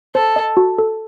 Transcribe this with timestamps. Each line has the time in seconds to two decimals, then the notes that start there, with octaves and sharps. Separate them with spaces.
0.15 A4 C5
0.36 D#5
0.57 F#4
0.78 A4